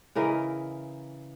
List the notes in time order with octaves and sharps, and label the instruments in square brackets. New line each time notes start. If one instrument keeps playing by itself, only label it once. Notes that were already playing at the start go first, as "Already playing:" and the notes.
[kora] C#3 E3 A#4 D#5